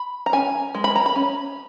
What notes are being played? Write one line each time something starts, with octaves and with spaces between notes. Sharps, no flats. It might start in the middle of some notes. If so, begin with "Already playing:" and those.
Already playing: B5
A#5
C#4 G#5
G#3
B5
A#5
B5
C#4